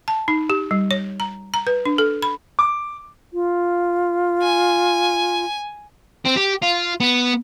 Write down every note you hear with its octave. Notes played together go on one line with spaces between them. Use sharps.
A5
D#4
G4
G3
C#5
A#5
A#5
B4
D4
A4
B5
D6
F4
G#5
C4
G4
F4
B3